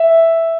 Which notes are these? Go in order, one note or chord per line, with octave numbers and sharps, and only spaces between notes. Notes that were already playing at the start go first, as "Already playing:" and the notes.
Already playing: E5